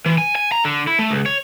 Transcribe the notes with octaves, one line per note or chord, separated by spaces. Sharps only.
E3
G#5
G#5
A#5
D3
E4
A3
C#2
C#5